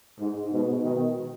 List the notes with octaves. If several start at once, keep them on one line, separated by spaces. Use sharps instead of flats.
G#2
G#2 B2
B2 D#3